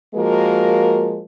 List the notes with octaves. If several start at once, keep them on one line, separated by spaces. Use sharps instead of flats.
F3 G#3 A#3 F#4 A#4